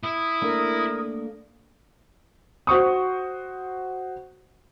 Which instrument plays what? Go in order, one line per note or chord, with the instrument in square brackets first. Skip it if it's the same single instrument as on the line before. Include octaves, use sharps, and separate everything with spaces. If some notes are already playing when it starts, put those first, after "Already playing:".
[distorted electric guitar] E4 [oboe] D#6
[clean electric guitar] A3 A#3 D4 [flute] A#4
[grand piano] F#4 C5 C#6 D#6